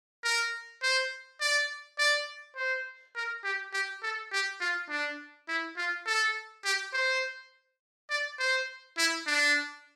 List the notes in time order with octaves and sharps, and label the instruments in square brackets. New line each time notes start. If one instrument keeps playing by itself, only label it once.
[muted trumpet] A#4
C5
D5
D5
C5
A#4
G4
G4
A4
G4
F4
D4
E4
F4
A4
G4
C5
D5
C5
E4
D4